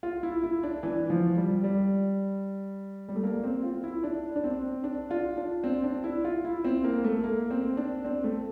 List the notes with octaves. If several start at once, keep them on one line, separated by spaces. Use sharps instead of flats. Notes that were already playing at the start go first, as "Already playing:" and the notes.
F4
E4
E4
D4
E3
F3
G3
G3
G3
A3
A#3
C4
F4
E4
D4
D4
C4
D4
F4
D4
C4
D4
E4
F4
E4
C4
A#3
A3
A#3
C4
D4
C4
A3